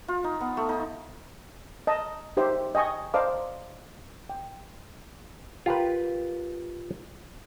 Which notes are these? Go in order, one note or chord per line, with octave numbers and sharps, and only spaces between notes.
F4
D#4
B3
A3
D#4
D#5 A5
D#4 G4 C5 E5
D#5 G5 G#5 C#6 D#6
C5 D5 D#5 F5 A5 D6
G5
F4 G4 A#4 B4